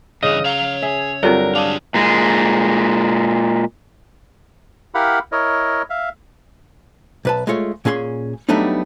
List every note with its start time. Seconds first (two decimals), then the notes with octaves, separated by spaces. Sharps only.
0.22 G2 C#3 E3 D#5
0.45 C#5 F5 A#5
0.82 G#4 E5
1.23 G2 D3 F#3 C4 F4 A4 A#4
1.55 D4 F4 G#4 F5 D6
1.94 A#2 G#3
4.95 E4 G4 A#4 F5 F#5 B5
5.32 E4 A#4 C#5 D#5
5.90 E5 F5
7.25 B1 B4 A5
7.47 G#3 A3 F4 C#5
7.85 A#2 C#4 G#4 F5 C6
8.49 F#3 G3 A3 B3 D4 D#4